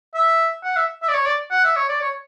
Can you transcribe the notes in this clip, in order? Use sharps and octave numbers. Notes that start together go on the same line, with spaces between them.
E5
F#5
E5
E5
D5
C#5
D5
F#5
E5
C#5
D5
C#5